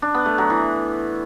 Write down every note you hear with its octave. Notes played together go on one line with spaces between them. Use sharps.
D4
B3
A3
F#3
E3